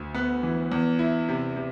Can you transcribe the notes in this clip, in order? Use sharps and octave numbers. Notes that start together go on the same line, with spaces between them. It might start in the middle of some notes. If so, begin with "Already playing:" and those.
Already playing: D2
B3
E3
E2
E4
C3
C3